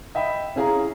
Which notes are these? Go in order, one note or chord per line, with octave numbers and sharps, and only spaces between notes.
D#5 E5 G5 B5
C#4 E4 G#4 F5 G#5 A#5